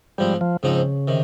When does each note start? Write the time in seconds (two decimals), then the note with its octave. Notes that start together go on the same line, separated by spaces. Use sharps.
0.18 G#2 F3 G3 C4
0.41 F3
0.63 G#2 C#3 F3 C4 D#4
1.08 C3 D#3